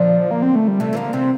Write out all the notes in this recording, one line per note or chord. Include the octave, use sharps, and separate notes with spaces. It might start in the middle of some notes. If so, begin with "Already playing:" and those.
Already playing: A#2 D3 F3
A#3
C4
A3
G3
C3 E3 A3
E3
D3 F3 A#3
C3 E3 C4